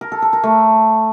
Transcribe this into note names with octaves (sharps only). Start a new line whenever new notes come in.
A#4
A4
A4
A#4
A3